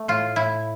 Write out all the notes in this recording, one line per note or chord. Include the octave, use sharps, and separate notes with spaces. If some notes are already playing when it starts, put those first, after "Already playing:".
Already playing: A3
A2 F4
A2 E4